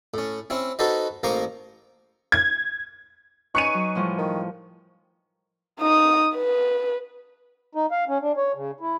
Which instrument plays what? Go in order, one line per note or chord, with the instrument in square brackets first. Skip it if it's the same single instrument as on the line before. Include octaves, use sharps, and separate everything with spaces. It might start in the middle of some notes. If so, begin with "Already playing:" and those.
[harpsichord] A2 C#4
C4 C#4 E4
D#4 F#4 A4 B4 C5 D#5
A1 A#3 C5 A#5 C#6 D#6
[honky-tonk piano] G#6
[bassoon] D#4 [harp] B4 C#5 G#5 [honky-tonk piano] C#6 C#7 D#7
[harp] F#3
A2 F3 G3
[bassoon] D#3
[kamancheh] D#4 D#6
B4
[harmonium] D#4
F5
C#4
D4
C#5
C#3
E4